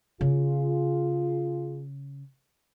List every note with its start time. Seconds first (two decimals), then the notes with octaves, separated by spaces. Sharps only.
0.21 C#3 F4 G#4